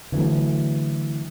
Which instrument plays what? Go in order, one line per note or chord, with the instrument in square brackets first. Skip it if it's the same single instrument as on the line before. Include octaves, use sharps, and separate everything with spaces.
[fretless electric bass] D3 E3 F#3 A3